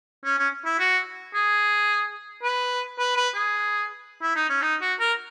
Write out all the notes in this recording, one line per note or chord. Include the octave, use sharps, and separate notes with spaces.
C#4
C#4
E4
F#4
G#4
B4
B4
B4
G#4
E4
D#4
C#4
D#4
F#4
A#4